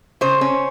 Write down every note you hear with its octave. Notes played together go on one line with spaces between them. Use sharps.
C#3 C5
C#4